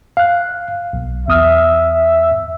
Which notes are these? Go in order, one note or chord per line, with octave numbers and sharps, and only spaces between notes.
F5 F#6
B1
E2 E5 D#6 F6